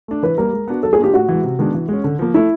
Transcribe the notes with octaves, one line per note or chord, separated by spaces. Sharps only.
A3 D4
E3 B4
G3 A#3 A#4
G#3
B3 D4 F#4
F#3 A4
G#4
A#3 D4 F4 G4
A2 F#4
E3 G#3
C3
D#3 G#3 B3 D4
E3
G#3 C#4
D3
F3 A#3
A3 E4